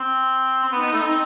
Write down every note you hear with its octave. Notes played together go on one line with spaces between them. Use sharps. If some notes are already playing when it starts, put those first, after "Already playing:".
Already playing: C4
C4
B3 D#4
B3
A3
C4